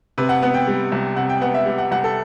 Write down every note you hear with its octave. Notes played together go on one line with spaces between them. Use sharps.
C3 B4
F#5
B3 F#5
G5
G3
C2
C3 F#5
G5
B3 F#5
E5
G3
F#5
C2 F#5
A4